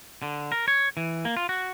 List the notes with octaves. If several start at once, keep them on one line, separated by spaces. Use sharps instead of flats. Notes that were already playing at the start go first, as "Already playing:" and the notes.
D3
A#4
C#5
E3
A#3
F4
F#4